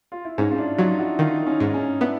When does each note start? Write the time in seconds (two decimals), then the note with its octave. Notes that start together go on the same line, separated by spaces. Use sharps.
0.12 F4
0.25 E4
0.38 G#2 C#4 D#4
0.51 F4
0.58 D4 E4
0.78 F#3 D#4 F4
0.99 E4 F#4
1.19 D#3 D#4 F4
1.47 C#4 D#4
1.60 G#2
1.74 C#4 D#4
2.01 B3 D4 E4